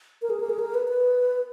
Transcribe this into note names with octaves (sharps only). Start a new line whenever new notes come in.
A#4
G#4
A#4
G#4
A#4
B4
B4